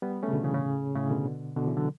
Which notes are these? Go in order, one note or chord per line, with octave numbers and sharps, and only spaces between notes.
G3 B3
A3 C#4
C#3
B2 D3
C#3 E3
A2 C#3
A2 C#3
B2 D3
B2 D3
C#3 E3
D3 F#3